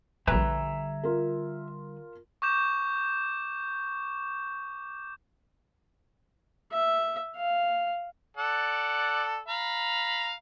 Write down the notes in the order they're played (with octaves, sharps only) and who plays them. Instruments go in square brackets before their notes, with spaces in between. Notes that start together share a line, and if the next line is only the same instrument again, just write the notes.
[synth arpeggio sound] A#1 B4 [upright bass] D3 G3 [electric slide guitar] E5 G#5 A#5
[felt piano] F4 A#4
[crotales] C#6 D6 G6 E7
[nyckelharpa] E5
F5
[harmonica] A4 D5 F#5
F5 A#5 B5